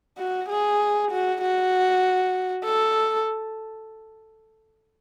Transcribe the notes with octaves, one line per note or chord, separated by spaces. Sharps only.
F#4
G#4
F#4
F#4
A4